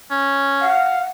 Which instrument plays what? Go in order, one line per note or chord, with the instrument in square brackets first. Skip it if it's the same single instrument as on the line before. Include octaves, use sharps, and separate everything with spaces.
[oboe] C#4
[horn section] F5 [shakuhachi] F#5